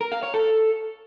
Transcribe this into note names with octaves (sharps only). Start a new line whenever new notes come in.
A#4
F5
C#5
A4